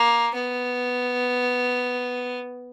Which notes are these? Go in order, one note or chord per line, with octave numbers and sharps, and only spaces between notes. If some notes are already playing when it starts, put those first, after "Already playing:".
Already playing: A#3
B3